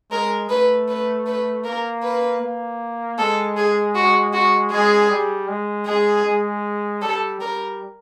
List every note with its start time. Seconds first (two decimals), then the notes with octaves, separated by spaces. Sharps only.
0.11 G#3 A#4
0.50 A3 B4
0.88 B4
1.26 B4
1.64 A#3 A#4
2.03 B4
2.41 A#3
3.18 G#3 A4
3.57 G#4
3.95 F#4
4.33 F#4
4.71 G#3 G#4
5.10 G3
5.49 G#3
5.86 G#3 G#4
6.25 G#3
7.02 G3 A4
7.41 G3 A#4